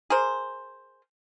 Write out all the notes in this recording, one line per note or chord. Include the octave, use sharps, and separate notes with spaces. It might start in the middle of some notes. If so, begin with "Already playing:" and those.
G#4 A#4 C5